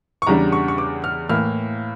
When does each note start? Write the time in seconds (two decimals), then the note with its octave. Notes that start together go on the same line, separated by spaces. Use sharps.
0.22 C#6
0.27 E2 C#3 G3 D4 A#5
0.52 C#6
0.68 C#6
0.78 D6
1.04 F6
1.29 A2 E3 A#3 F6